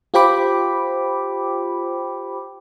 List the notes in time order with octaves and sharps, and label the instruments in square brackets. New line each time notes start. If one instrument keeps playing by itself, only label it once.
[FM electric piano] F4 G4 C5 G5 B5 D6